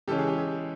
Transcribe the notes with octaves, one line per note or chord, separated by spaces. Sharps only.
C#3 E3 G#3 C#4 G4 A4
G#4
G4
G#4